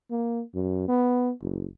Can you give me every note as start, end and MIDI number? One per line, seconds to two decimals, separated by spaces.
0.11 0.42 58
0.55 0.86 42
0.88 1.32 59
1.41 1.66 30